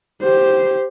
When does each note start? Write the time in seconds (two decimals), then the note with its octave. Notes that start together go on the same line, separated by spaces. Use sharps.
0.22 G4 C5